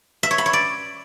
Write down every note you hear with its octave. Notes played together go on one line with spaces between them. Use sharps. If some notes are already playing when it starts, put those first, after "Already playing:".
E5
C#5
B5
C#5
D5